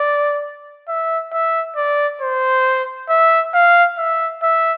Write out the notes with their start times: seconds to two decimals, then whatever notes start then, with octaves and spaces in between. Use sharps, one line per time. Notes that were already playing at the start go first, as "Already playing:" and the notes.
Already playing: D5
0.88 E5
1.32 E5
1.76 D5
2.22 C5
3.10 E5
3.54 F5
3.98 E5
4.43 E5